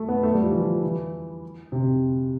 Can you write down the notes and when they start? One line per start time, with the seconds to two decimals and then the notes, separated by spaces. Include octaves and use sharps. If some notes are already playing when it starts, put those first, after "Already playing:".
Already playing: A3
0.08 B3
0.23 A3
0.34 G3
0.44 F3
0.52 E3
0.61 F3
0.83 E3
1.72 C3